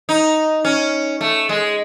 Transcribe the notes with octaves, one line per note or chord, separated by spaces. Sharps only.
D#4
C#4
A3
G#3